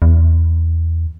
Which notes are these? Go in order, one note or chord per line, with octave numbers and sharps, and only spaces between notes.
E2